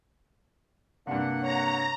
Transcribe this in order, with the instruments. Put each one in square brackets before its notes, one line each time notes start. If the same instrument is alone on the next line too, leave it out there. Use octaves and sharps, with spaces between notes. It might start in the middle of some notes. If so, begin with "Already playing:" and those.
[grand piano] G2 C3 [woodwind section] A#3 F#5 [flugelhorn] D4
[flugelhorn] C#5 [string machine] A#5